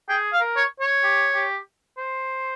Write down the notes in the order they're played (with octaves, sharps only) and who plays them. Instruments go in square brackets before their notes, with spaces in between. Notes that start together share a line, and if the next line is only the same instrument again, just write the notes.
[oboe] G#4 [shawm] G5
[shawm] F5
[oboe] A#4
[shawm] C#5
C#5
[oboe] G4
G4
C5